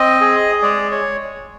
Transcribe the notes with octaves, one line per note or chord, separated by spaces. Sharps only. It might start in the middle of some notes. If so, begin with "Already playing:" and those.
Already playing: C4 D#5
G#4
G#3 D5
C#5